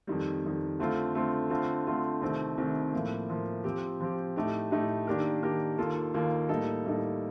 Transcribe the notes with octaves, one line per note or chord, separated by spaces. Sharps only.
F2 D#3 G3
F2 D#3 G3
D3 A3 C4 F4
D3 A3 C4 F4
D3 A3 C4 F4 C5
D3 A3 C4 F4 C5
C2 C3 D#3 A3 C4
C2 C3 D#3 A3 C4
A2 F3 A#3
A2 F3 A#3
F3 C4 G4
F3 C4 G4
A2 A3 D#4 G4
A2 A3 D#4 G4
D#3 A#3 D4 G4 A#4
D#3 A#3 D4 G4 A#4
D#2 D#3 A#3 F4 A4
D#2 D#3 A#3 F4 A4
A2 G3 A#3 D#4 A4
A2 G3 A#3 D#4 A4